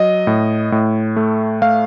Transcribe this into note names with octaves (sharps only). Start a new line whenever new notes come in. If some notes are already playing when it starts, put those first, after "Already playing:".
Already playing: F#3 D#5
A2
A2
A3
A3 F5